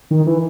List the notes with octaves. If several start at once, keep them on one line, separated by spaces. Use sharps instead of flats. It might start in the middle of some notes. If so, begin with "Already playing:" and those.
D#3
E3